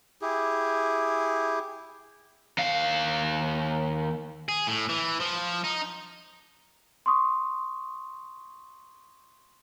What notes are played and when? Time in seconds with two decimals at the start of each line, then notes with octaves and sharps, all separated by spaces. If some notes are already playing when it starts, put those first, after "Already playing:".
0.22 E4 G4 G#4
2.58 D#2 F5
4.49 G#4
4.67 A2
4.89 E3
5.21 F3
5.64 D#4
7.06 C6 C#6 D#6